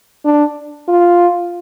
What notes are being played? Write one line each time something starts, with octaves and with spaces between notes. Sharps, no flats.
D4
F4